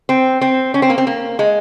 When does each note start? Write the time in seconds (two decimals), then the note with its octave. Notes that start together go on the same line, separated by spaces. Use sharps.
0.09 C4
0.41 C4
0.74 C#4
0.82 C4
0.90 A#3
0.98 C4
1.07 A#3
1.39 G#3